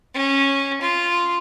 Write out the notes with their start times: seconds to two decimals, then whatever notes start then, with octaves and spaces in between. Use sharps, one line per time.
0.14 C#4
0.81 F4